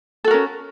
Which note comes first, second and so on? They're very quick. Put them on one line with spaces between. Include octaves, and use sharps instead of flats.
A4 F#4 A#4 C#4